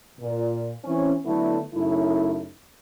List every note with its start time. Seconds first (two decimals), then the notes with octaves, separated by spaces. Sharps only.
0.18 A#2
0.84 E3 C4 C#4
1.25 D3 F#3 A3 B3 E4
1.73 F#2 C#3 A3 D#4 E4